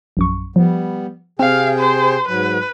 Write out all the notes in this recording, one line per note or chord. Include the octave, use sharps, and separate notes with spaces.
A#1 F#2 C#6
F3 G3 B3
C3 C4 G#4 F5 G5
C5
G#2 F#3 B4